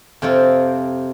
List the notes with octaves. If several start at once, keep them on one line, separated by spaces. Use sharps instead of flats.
F2 C3 F3 C4 F4